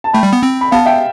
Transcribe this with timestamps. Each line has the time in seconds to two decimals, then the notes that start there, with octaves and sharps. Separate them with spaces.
0.04 A5
0.13 A3 G5 B5
0.23 G3
0.33 B3
0.43 C4
0.61 B5
0.72 B3 F5 A5
0.86 E5 G5